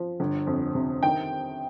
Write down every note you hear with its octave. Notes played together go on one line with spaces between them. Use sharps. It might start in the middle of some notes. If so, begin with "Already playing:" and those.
Already playing: F3
G1
F2
C3
D#3 G5